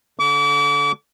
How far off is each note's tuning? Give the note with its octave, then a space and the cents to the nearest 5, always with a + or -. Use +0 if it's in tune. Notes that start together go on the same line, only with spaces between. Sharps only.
D3 -20 D6 -35